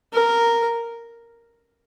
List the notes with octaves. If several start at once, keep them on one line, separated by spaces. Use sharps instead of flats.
A#4